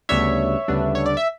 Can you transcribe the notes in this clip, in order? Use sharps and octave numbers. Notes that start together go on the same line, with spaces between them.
D2 C#3 G3 B3 D4 C#5 E5
D2 C#3 G3 B3 D4
C#5
D5
E5